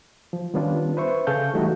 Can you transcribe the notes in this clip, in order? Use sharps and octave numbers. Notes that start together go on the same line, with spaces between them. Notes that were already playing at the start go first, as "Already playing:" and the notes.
F3
D#3 G3 B3 C#4 D4 F4
B4 C5 E5 C#6
C#3 G#4 A4 F5 C#6 G6
E3 G3 A3 D#4 F#4